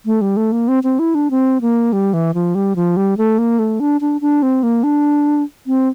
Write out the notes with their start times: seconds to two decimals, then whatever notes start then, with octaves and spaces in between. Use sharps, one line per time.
0.06 A3
0.21 G3
0.37 A3
0.52 A#3
0.68 C4
0.83 C4
0.99 E4
1.15 D4
1.31 C4
1.61 A#3
1.93 G3
2.13 E3
2.34 F3
2.55 G3
2.76 F3
2.97 G3
3.17 A3
3.38 A#3
3.59 A3
3.80 D4
4.01 D4
4.21 D4
4.43 C4
4.63 A#3
4.83 D4
5.67 C4